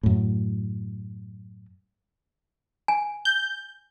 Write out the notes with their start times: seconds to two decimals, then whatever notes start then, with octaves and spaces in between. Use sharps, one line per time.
0.03 F#2 A2
2.88 G#5
3.25 G6